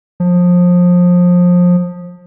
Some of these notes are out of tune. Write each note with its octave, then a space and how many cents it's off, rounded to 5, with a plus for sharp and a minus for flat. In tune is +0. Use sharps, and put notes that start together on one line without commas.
F3 +25